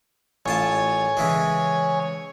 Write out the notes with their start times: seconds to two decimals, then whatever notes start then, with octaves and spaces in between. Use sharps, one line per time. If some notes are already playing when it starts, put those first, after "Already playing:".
0.46 A1 F4 C#5 G#5 A5
1.17 C#3 E3 G#3